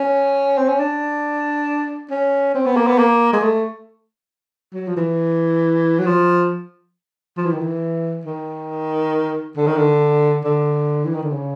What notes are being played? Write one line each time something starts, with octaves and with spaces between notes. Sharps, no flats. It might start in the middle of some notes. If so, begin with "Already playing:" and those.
Already playing: C#4
C4
C#4
D4
C#4
C4
B3
A#3
B3
A#3
G#3
A3
F#3
F3
E3
F#3
F3
F3
E3
D#3
E3
D#3
D3
D#3
D3
D3
E3
D#3
D3
C#3